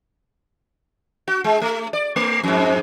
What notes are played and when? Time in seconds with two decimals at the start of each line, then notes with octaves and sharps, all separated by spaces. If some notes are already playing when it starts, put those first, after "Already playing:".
1.28 F#4
1.44 G#3
1.62 A3
1.93 D5
2.16 A3
2.43 F2 G#2